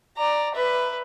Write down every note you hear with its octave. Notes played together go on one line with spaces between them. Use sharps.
D5 A#5
B4 E5